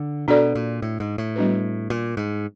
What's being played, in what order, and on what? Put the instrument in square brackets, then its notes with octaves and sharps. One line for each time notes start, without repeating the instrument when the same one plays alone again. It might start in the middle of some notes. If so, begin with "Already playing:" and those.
Already playing: [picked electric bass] D3
[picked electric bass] B2 [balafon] D4 F#4 A4 D5
[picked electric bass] A#2
A2
G#2
A2
[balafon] G3 B3 D4 F#4 B4
[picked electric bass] A#2
G#2